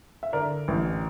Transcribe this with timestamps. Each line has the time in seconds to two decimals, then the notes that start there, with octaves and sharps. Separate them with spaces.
0.23 E5
0.33 D3 A#4 D5
0.68 A1